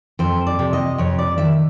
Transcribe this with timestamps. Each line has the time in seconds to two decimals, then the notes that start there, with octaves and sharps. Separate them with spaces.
0.19 F2 C5
0.47 D5
0.59 C3
0.73 D#5
0.98 F2 C#5
1.19 D5
1.38 D#3 E5